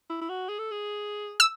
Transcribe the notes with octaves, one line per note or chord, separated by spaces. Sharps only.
E4
E4
F#4
G#4
A4
G#4
E6